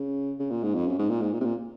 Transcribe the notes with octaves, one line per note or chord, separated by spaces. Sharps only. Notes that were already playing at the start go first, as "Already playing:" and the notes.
Already playing: C#3
C#3
A#2
G#2
F2
F#2
G#2
A#2
G#2
A#2
C3
A#2